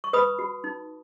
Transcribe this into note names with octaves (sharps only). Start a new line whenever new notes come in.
C#6
B4 B5 D#6
F#4
D#4